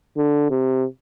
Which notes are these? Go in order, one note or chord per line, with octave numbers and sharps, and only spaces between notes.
D3
C3